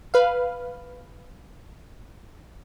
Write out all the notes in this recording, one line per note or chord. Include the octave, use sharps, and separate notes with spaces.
B4 F5